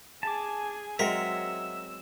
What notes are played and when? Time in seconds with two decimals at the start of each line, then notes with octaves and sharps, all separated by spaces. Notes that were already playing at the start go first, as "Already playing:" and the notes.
0.23 G#4 G#5 A5 D6
0.99 F#3 G#3 C4 A#4 E5 F#5 E6